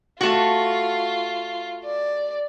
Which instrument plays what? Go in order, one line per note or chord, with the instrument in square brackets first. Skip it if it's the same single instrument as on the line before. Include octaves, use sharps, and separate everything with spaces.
[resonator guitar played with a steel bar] A3 F#4 [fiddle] F4
[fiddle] D5